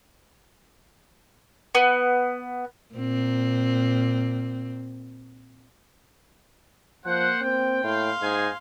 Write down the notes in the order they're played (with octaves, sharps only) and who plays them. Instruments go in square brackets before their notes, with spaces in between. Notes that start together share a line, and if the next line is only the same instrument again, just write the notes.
[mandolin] B3
[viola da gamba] A#2 C4
[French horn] F3 [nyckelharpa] A#3 [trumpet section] C5 F#5
[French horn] C4 [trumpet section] G5
[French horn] A2 [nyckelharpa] F5 C6
[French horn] G#2 [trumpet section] D#4 G#4 G#5